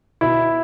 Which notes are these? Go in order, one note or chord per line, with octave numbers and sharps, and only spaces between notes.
B2 E4